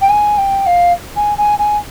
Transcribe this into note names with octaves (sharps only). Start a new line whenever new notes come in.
G5
G#5
G5
F5
G#5
G#5
G#5